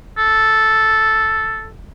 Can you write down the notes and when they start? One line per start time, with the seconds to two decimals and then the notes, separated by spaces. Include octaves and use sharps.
0.18 A4